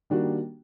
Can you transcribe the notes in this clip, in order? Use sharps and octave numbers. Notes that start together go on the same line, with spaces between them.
D#3 G3 A#3 D4 F#4